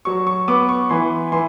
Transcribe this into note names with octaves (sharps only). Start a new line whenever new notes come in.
F#3 C#6
C#6
B3 D6
C#6
E3 C6
E3 C6